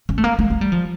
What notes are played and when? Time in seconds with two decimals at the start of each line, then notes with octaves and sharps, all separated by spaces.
0.09 C#4
0.18 A3
0.24 A#3
0.39 A3
0.50 A3
0.61 G3
0.72 F3